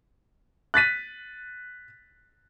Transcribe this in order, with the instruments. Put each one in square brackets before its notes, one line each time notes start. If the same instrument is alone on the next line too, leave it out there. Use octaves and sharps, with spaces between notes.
[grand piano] F#6 A6 B6 D#7